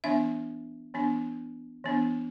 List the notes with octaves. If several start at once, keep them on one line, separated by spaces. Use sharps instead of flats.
E3 B3 D4 E5
E3 B3 D4
E3 B3 D4